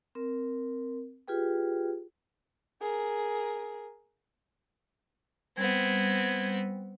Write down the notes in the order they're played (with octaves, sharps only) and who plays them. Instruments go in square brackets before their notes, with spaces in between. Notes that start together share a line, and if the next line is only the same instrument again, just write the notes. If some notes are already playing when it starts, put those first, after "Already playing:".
[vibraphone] C4 A#4
F4 G4 G#4 B4 G5
[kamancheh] G#4 A#4
[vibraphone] G3 [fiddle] B3 C4 [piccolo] G#6